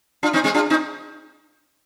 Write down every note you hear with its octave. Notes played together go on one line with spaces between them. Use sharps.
D4 F4
C4 D#4
G#3 C4
D4 F4
C4 D#4